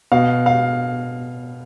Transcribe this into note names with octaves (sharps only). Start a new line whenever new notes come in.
B2 F5
F5